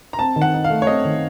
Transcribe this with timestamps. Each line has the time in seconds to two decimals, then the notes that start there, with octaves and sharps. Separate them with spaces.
0.13 A#5
0.19 C4 A5
0.36 D#3
0.42 F#5
0.54 D#4
0.64 F5
0.70 A3
0.82 C#5
0.87 C4 D#5
1.05 D#3